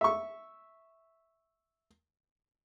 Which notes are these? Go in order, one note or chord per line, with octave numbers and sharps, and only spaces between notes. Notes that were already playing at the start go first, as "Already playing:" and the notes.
E5 C#6